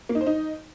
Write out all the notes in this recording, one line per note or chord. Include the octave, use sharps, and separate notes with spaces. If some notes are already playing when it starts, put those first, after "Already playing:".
A#3
D#4
C5
D#4